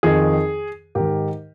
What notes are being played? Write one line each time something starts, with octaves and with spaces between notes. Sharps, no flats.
F2 D#3 G#4
G#2 D#3 G4 A#4